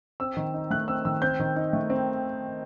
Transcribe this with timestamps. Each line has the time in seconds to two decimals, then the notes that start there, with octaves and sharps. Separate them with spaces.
0.20 C4 E6
0.37 D#3
0.54 D#4
0.71 A3 F#6
0.88 C4 E6
1.05 D#3 E6
1.22 C4 G6
1.40 D#3
1.56 D#4
1.73 A3
1.90 C4